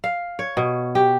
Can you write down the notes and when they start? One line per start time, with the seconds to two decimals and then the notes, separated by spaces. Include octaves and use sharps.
0.04 F5
0.39 C#5
0.57 B2
0.95 G4